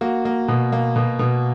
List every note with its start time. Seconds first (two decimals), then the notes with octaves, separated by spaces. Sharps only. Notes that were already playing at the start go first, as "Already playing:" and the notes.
0.01 A#3 F#4
0.25 A#3
0.48 B2
0.72 A#3
0.96 B2
1.19 B2